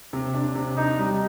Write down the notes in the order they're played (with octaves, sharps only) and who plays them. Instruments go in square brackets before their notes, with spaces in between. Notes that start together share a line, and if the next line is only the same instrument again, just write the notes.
[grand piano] C3
D4
C3
[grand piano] D4 [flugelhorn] D#4
[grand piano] G3